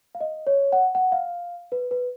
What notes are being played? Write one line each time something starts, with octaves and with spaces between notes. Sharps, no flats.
F5
D#5
C#5
F#5
F#5
F5
B4
B4